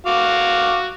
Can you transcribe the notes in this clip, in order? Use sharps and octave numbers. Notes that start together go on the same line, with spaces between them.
F#4 F5 D6